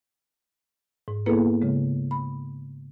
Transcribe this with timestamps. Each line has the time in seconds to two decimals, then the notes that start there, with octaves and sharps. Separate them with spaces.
1.08 G#2
1.26 A#3 B3 E4 G#4 A4 B4
1.62 C#3 G#3
2.11 B5